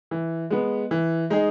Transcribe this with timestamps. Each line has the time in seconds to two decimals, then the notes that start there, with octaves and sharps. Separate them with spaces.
0.11 E3
0.50 G#3 B3
0.91 E3
1.30 G#3 D#4 G#4